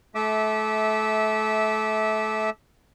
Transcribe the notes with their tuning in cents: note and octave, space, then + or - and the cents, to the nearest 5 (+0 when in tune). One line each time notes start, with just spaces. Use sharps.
A3 -25 E5 -20 D6 +0